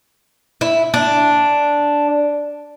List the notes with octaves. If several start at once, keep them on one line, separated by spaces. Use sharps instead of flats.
E4
D4